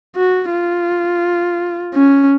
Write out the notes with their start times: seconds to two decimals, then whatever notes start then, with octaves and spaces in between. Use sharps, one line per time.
0.16 F#4
0.52 F4
1.95 C#4